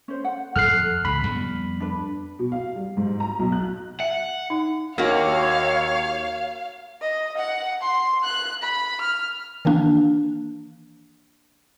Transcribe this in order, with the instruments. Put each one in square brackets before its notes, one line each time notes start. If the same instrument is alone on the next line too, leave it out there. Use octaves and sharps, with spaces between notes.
[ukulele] C#4 C5
F#5
[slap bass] F2 [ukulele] A4 [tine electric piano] F6 F#6 C7
[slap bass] C#2 [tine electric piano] B5
[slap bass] F2 G3 B3
[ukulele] D4 B4
[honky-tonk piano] B2
F5
G3
G#2
A#5
B1
F#6
[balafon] E5 [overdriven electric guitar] F#5
[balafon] D#4
[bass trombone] D#2 [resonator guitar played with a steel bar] A#3 F#4 [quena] C#5 [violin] F5
[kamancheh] D#5
F#5
C6
F#6
B5
F6
[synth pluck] D#3 E3 A#3 D4